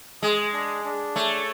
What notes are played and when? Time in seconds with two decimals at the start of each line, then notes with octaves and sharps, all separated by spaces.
0.22 G#3 G#4
0.53 D4
0.85 D4
1.15 A3 C#5